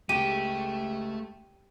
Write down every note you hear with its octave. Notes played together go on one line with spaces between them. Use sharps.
C#2 G#3 A3 G4 D#7